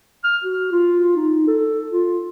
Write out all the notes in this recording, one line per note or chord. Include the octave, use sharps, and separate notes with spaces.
F6
F#4
F4
D#4
A4
F4